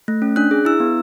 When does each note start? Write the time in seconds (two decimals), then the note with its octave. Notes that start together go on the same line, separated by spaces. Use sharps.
0.08 A3
0.22 C#4
0.36 D4 F#6
0.51 G#4
0.65 E4 E6
0.80 B3